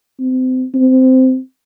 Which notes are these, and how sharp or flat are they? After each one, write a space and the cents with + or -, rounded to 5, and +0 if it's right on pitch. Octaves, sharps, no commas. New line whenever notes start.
C4 -30
C4 -15